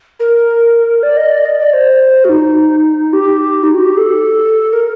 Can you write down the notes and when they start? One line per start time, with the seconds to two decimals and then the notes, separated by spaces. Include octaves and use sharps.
0.20 A#4
1.03 D5
1.17 D#5
1.32 D5
1.45 D#5
1.59 D5
1.73 C5
2.24 F#4
2.29 D#4
3.13 G4
3.63 D#4
3.74 F#4
3.85 G4
3.97 A4
4.73 A#4